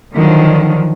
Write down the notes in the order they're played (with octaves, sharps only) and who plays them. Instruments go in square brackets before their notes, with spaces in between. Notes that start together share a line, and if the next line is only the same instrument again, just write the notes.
[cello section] D3 D#3 F3 F#3